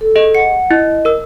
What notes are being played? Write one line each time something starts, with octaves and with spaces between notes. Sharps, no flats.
A4
G#4 D#5
F#5 C#7
E4 D#5
A#4 E6